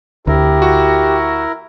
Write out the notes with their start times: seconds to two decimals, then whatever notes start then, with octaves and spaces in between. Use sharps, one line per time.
0.27 D2 E4 G4 A#4
0.62 F#4